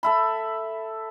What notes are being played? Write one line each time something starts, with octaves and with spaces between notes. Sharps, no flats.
A4 E5 B5